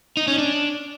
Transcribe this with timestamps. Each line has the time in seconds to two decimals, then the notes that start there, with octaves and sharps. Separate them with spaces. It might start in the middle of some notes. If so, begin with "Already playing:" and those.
0.17 D#4
0.28 C#4
0.38 D4